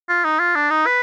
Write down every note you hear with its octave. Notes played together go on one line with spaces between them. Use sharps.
F4
D#4
F4
D4
D#4
B4